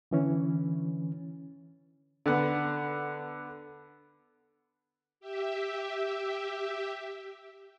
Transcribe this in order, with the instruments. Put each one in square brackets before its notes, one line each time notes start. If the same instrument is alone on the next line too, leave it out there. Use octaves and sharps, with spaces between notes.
[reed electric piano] D3 E3 C#4
[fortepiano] D3 B3 F#5
[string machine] G4 E5